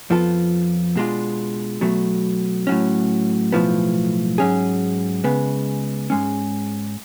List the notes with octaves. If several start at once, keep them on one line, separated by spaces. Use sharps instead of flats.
F2 F3 B3 F4 A4
B2 G#3 D4 F4
B2 F#3 A3
A2 F#3 C#4
B1 A2 F3 B3
G#2 F#3 C#4 G#4
C#2 C#3 G#3 B3
G#2 G#3 C#4